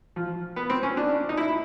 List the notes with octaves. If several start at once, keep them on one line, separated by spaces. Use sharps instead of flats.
F3
B3
C4
C#4
D4
D#4
E4